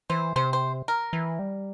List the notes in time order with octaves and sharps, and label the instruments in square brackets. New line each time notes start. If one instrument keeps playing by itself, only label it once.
[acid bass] E3 [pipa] C5
[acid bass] C3 [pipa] C5
[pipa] C5
A#4
[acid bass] E3
G3